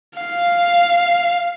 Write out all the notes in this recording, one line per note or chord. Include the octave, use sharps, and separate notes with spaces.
F5